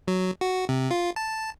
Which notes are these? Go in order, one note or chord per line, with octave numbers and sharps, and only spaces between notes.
F#3
F#4
C3
F4
A5